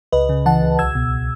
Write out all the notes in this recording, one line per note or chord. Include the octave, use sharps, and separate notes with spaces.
C#2 B4 D#5
C#3
E3 F#5 A5
C#2
B1 E6 G#6
B2